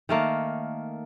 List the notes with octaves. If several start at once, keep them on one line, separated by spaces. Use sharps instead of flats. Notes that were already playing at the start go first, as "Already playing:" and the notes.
D#3 A3 A#3